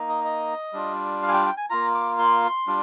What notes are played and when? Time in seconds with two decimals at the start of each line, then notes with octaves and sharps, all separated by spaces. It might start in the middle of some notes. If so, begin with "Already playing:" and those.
Already playing: A#3 D#4
0.09 D#5
0.25 D#5
0.73 G3 D4 F4
1.22 F5
1.28 G#5
1.34 G5
1.46 G5
1.57 G#5
1.70 A#3 F4 A#5
1.95 D6
2.19 C6
2.67 G3 D4 F4